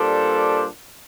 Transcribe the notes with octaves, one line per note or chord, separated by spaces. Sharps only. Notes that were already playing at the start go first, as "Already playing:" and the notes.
Already playing: A#2 G3 D4 A4 C5